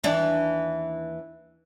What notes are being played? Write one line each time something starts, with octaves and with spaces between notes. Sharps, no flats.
D#2 E3 D4